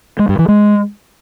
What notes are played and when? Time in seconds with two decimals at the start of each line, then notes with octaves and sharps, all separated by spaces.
0.19 G#3
0.29 G2
0.39 E3
0.48 G#3